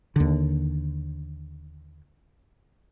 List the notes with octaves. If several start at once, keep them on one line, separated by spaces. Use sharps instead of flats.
D#2 D3